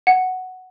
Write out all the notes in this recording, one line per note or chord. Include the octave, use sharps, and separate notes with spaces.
F#5